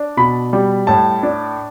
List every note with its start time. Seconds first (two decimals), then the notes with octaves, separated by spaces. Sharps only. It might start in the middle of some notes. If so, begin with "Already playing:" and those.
Already playing: D4
0.17 B2 B5
0.53 G3
0.87 A2 A5
1.23 D4